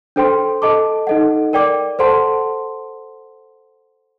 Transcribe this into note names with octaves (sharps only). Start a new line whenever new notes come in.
D4 A4 C5 G5 C6
A4 D#5 A5 D6
D#4 A4 D#5 F#5
A#4 D5 G5 D6
A4 C5 F#5 A5 C6